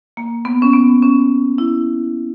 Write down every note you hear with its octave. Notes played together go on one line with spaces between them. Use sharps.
A#3
B3
C#4
B3
C#4
E4